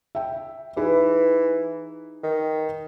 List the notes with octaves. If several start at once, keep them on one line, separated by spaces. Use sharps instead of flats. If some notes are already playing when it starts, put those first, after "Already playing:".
E5 G5
E3 D#4 G#4 B4
D#3